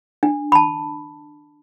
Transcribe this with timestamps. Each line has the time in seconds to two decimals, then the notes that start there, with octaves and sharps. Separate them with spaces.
0.23 D4
0.52 A5 B5